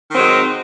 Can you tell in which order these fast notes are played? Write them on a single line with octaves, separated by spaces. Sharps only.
D#3 C4 F#3 G#3